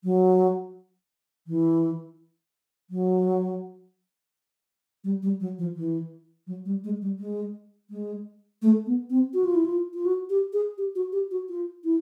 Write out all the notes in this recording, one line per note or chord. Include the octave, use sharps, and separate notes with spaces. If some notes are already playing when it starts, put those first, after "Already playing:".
F#3
E3
F#3
G3
G3
F#3
F3
E3
F#3
G3
G#3
G3
G#3
G#3
A3
B3
C4
F#4
F4
E4
F4
F4
F#4
G4
G#4
G4
F#4
G4
F#4
F4
E4